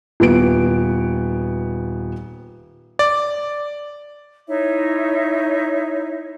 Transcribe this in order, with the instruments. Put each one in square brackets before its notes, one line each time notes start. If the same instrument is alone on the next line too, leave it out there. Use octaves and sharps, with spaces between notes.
[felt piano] D#1 B3 D7
[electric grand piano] D5
[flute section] D#4 E4 C#5 E5